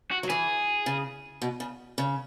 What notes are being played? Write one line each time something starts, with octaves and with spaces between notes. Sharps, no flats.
F#4
F#3
E3 G#4
C#3
B2
C#3
C#3